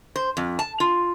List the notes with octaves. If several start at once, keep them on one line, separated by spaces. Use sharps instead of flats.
C5
F2
A5
F4